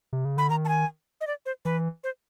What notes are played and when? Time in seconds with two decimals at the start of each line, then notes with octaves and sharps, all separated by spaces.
0.13 C3
0.25 C#3
0.37 D3 B5
0.50 D#3 A#5
0.65 A5
0.69 G#5
1.21 D#5
1.27 D5
1.46 C5
1.65 E3 B4
2.04 C5